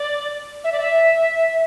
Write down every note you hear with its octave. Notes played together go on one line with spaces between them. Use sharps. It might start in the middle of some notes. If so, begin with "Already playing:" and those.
Already playing: D5
E5
D5
E5